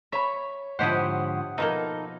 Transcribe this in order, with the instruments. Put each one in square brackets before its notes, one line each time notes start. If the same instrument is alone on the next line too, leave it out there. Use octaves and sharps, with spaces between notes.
[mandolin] C#5 B5 [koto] E5
[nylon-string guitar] G#2 D3 F3 [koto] E4 G4 C5 [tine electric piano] F#5 D#6
[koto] B2 F3 A#3 [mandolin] D#4 [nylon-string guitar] A4 A5